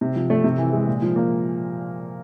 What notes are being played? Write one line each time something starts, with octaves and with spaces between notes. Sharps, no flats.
C3
F3
A3
C3
E3
G#3
A#2
F3
A#3